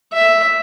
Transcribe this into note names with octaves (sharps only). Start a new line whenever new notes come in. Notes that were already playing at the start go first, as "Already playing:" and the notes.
E5